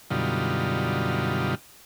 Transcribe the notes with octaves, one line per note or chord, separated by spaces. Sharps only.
F#2 B2 D3 G3 D#4 F4